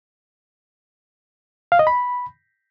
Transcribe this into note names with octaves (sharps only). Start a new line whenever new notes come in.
F5
D#5
B5